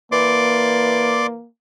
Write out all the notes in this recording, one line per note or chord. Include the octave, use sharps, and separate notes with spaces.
E3 A#3 D5 C6 D6